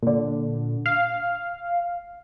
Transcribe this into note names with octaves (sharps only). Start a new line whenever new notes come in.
A#2 D3
F5